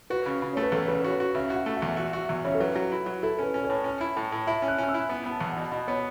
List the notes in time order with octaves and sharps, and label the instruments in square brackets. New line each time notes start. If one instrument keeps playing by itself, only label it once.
[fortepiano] F#4 [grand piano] B4
[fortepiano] C#3
C#3
[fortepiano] A3 [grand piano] C#5
[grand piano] B4
[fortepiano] E2 [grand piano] A4
[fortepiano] C#3 [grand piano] B4
[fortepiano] F#4 [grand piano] C#5
[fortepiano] F#4
[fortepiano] C#3 [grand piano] E5
[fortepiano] F#4
[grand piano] F#5
[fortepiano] A3
[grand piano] E5
[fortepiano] E2
[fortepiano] F#4 [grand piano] E5
[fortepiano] F#4 [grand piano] E5
[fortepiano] E2 [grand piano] E5
[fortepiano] C#3 [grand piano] C#5
[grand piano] A4
[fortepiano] F#3 [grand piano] B4
[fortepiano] F#3
E4
F#3
[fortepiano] E4 [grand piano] A4
[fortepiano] C#4 [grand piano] B4
[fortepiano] C#4
[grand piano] C#5
[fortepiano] A2
C#4
E4
A2
A2
[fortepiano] E4 [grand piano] E5
[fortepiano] C#4
[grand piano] F#6
[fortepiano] C#4 [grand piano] F#6
[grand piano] E6
[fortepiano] E4
[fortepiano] B3 [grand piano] B5
[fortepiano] B3
[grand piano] A5
[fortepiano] E2
[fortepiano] B2 [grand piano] F#5
[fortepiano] B2
[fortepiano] B3 [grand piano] C#5